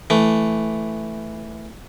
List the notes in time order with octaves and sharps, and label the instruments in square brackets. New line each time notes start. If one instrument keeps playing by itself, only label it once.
[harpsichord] E3 A3